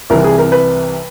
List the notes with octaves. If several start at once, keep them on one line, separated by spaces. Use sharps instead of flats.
C2 C3 E3 A#4
G#4
A#4
B4